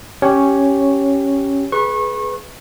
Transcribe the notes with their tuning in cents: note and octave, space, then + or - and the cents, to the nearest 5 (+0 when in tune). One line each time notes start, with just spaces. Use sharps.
C#4 +0 G4 -10 C#5 +0
G#4 +25 B4 +0 C#6 -30